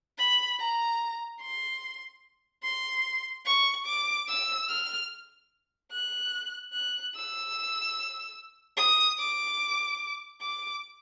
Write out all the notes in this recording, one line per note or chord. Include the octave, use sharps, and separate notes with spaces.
B5
A#5
C6
C6
C#6
D6
E6
F6
F#6
F#6
E6
D#6
D6
D6